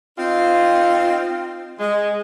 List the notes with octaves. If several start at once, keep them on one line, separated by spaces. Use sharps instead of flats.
C4 D#4 F4
G#3